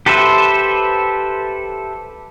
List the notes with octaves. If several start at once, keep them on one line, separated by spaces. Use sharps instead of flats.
G4 A4 B4 C5 E5